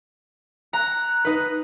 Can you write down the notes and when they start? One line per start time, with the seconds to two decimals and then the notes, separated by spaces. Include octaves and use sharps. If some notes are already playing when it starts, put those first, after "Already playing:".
0.73 A#5 F#6
1.25 D#4 B4